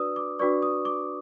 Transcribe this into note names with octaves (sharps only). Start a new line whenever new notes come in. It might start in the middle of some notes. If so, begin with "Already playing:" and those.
Already playing: D4 F#4 B4 D5 D#6 E6
D6
D4 F#4 B4 D5 C#6
D#6
D6